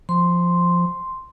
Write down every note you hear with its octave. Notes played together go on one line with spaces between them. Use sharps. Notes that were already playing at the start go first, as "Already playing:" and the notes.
F3 C6